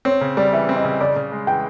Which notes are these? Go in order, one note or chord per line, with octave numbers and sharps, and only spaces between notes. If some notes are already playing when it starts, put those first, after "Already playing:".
C4 C#5
C#3
G3 D5
E3 E5
C4
D#5
C#3
C#3 D5
C#3
G#3
E3 G5